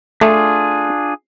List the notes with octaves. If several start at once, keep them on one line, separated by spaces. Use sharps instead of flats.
A3 D4 F4 G#4